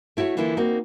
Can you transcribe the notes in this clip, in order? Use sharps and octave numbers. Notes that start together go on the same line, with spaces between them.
A3 E4 F#4 B4 C#5
D3 E3 A#3 E4 F4
A#3 C4 D#4 F#4